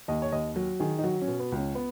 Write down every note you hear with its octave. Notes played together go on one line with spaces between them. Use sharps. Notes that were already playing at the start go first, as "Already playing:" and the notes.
D#2 D#5
C#5
D#2 D#5
F#3
D#3 G#4
D#4
F#3 F#4
C#4
B2
B3
C#2
C#4
B3